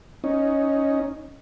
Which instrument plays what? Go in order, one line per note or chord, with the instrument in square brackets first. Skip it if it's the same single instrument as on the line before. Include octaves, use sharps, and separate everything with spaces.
[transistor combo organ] C#4 D#4